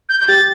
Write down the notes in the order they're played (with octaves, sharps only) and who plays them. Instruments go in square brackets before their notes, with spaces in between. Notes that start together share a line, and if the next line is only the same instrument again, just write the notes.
[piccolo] G6
G6
[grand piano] G4 [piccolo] A6